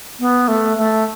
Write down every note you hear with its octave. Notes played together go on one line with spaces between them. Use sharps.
B3
A3
A3